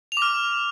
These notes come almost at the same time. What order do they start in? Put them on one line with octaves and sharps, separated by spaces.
F7 D6 F6